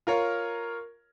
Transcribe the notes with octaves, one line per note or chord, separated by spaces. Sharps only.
F4 A#4 C#5